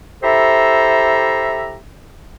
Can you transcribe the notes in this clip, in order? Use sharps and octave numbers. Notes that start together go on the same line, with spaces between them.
E4 G4 A4 C5 E5 A#5